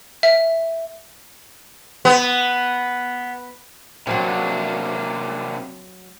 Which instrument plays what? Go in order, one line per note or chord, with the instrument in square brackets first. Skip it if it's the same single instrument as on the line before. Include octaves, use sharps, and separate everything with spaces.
[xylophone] E5
[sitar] B3
[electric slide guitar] C3 A#3 D4 [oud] F#3 C4